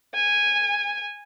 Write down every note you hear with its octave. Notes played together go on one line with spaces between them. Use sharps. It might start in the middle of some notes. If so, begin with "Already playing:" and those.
G#5